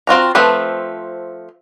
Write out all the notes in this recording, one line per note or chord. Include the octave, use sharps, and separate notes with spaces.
C4 F4 F#4 A#5
F3 A3 C4 B4